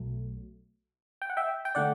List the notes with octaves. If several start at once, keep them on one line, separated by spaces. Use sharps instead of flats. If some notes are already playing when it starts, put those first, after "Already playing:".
Already playing: B1 B2 F#3 A3
G5
F#5
E5 G5
G5
D3 A3 D5 F#5